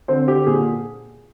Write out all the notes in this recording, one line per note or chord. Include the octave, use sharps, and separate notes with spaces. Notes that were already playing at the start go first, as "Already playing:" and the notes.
D3 C4 C5
D3 G4
A#2 G#4